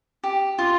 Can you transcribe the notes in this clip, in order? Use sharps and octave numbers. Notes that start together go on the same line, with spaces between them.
G4
F4